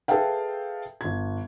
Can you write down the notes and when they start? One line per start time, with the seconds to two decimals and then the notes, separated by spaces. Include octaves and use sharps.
0.08 G#4 A4 B4 E5 F5 G5
1.01 G1 G#6